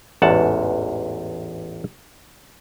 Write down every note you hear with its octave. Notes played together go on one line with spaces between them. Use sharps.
A1 E2 G#2 F#5 A5